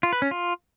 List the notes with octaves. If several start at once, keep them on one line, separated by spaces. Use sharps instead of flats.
F4
B4
C#4
F4